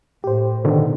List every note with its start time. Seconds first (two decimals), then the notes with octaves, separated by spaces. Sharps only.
0.24 A2 G4 C5
0.65 B2 D3 D#3